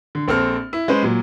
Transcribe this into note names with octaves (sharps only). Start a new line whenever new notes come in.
D3
A#1 C4 A4 F6
E4
G#3 C#4 B4 C5
A#2 F#3